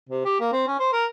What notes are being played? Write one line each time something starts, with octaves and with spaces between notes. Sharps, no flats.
C3
G4
A#3
C4
C#4
C5
A#4